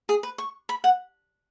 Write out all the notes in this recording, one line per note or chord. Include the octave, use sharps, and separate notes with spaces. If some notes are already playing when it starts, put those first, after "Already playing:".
G#4
B4
C#6
B5
F#5